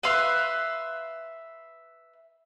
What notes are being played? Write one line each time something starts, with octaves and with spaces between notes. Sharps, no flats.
B4 E5 F5 C6